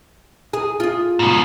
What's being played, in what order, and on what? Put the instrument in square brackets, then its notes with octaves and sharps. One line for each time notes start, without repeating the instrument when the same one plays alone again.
[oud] G#4
F4 G#4
[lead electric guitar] G#2 B2